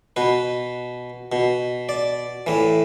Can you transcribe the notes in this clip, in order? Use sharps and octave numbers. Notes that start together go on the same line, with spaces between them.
B2 B4
B2
D5
A2 E3